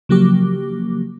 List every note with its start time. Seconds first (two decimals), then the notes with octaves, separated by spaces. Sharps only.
0.09 C#3 F3 F#3 A#3 G4 D6